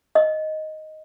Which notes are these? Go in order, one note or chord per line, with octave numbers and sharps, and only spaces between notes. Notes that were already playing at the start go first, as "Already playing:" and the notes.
D#5